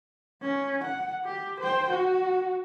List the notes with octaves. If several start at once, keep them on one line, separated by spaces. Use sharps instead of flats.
C#4
F#5
G4
C5 G5
F#4